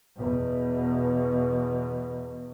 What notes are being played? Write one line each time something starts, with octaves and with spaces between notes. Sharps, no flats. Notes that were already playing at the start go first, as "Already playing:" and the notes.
E2 B2